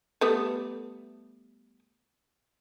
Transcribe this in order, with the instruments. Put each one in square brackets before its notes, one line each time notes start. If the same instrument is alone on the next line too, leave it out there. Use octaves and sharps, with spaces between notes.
[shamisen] G3 A3 B3